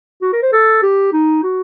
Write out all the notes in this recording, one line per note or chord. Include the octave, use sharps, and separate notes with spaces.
F#4
A#4
C5
A4
G4
D#4
F#4